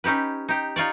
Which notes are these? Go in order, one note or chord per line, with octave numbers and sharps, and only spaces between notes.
C#4 D#4 G4 B4
D#4 G4
D#4 F4 C#5 D5